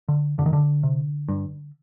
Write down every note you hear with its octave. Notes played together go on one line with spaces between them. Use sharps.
D3
F2 D3
D#3
D3
C3
G2